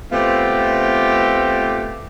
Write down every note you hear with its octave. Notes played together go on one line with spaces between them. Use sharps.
A3 B3 C4 F4 G4